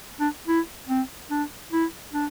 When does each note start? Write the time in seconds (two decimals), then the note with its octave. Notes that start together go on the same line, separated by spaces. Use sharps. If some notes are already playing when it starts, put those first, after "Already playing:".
0.20 D4
0.47 E4
0.89 C4
1.31 D4
1.72 E4
2.13 D4